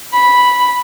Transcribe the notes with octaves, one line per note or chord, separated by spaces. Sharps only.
B5